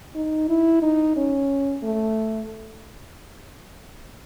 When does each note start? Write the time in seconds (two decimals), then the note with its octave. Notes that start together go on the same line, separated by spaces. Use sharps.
0.15 D#4
0.49 E4
0.82 D#4
1.16 C#4
1.83 A3